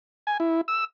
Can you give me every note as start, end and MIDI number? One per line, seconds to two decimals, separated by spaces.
0.27 0.37 80
0.40 0.61 64
0.68 0.85 88